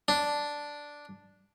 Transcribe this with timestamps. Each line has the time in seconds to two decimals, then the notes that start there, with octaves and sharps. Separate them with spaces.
0.08 D4